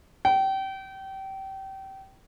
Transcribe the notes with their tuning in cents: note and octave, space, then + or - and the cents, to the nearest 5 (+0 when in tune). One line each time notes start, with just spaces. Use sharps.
G5 -25